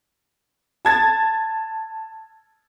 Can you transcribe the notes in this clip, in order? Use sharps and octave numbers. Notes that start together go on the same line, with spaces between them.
A5 G#6 A6